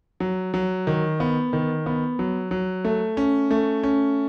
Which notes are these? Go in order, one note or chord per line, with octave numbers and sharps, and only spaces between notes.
F#3
F#3
D#3
B3
D#3
B3
F#3
F#3
A3
C#4
A3
C#4